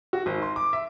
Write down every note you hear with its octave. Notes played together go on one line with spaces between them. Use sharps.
F#4
G#1
C6
D6
E5